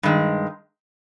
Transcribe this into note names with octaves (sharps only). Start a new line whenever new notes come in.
G2 D#3 G#3